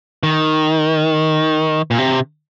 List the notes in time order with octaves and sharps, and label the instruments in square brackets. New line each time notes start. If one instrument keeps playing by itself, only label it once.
[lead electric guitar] D#3
A#2
C3